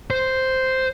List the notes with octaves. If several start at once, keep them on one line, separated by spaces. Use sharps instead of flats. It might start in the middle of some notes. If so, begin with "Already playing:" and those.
C5